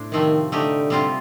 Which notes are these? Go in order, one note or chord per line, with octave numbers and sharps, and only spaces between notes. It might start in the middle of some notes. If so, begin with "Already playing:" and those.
Already playing: A2 D4 C5
C3 D#3 F3 A3 C4
D3 A3 D#4 G4
C3 G3 C4 F4